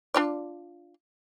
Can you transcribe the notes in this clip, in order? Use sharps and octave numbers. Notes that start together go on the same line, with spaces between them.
D4 F4 D5